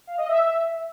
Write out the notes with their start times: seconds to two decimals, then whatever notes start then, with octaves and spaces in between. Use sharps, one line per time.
0.07 F5
0.18 D#5
0.28 E5